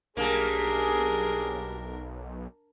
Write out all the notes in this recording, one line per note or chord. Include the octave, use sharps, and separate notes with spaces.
B1 G3 A#3 D4 G#4 A#4